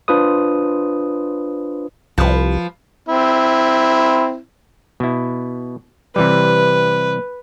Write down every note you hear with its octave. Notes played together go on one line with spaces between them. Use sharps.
D4 F4 B4 C5 D#6
C2 F3 B4
C4 E4
B2 E4
C3 E3 G3 B4